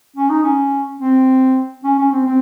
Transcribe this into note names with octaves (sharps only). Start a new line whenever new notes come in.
C#4
D#4
C#4
C4
C#4
C#4
C4
C4